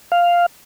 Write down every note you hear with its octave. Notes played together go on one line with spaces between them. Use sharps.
F5